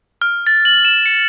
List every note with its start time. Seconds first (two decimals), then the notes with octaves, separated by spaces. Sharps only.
0.22 F6
0.47 A6
0.65 F#7
0.85 E7
1.06 C#7